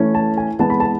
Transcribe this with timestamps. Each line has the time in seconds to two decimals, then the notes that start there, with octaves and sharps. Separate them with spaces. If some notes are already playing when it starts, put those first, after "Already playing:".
Already playing: E3 A3 C#4
0.15 A5
0.37 G#5
0.59 E3 G#3 B3 A5
0.70 B5
0.80 A5